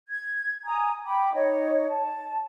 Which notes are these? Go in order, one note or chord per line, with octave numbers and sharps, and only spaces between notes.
G#6
G#5 A#5 D#6
G5 B5 D6
D#4 C#5 D#5
A5